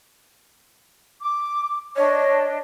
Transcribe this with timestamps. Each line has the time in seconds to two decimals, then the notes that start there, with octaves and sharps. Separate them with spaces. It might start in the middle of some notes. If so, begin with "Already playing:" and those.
1.22 D6
1.96 D4 C#5 D#5